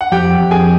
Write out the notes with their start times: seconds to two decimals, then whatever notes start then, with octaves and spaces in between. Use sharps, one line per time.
0.01 F#5
0.12 F2 G4 G5
0.38 F2
0.51 G#4 G#5